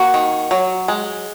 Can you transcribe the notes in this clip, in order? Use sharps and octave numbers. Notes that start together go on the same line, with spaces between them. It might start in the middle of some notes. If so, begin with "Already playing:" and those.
Already playing: A#3 F#4
D#3
F#3
G#3